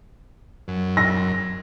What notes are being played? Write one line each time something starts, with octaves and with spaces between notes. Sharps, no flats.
F#2
A#6